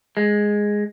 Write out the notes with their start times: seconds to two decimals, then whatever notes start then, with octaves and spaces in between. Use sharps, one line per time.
0.17 G#3